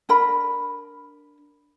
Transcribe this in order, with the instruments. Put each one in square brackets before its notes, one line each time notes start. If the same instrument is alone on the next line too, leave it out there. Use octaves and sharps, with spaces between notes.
[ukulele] D4 A#4 B5